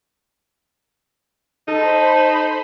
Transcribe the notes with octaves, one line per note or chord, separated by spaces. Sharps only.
D#4 A4 C5 B5